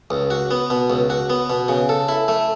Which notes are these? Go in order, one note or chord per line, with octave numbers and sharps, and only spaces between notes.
C#2
F#4
B3
B2
C#2
F#4
B3
B2
C#3
A4
E4
A3